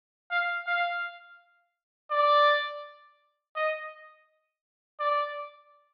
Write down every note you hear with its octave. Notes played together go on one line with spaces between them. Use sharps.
F5
F5
D5
D#5
D5